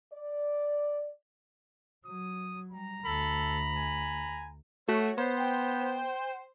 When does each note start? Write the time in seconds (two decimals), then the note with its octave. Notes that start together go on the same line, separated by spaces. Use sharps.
0.13 D5
2.05 F#3 D#6
2.71 G3 A#5
3.05 D2 A4 B5
3.76 G#5
4.89 A3 F#4 C#5
5.18 B3 C5
5.38 G5